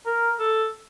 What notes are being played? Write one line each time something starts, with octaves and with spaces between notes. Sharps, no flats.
A#4
A4